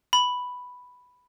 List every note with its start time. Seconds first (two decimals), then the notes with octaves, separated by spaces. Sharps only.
0.13 B5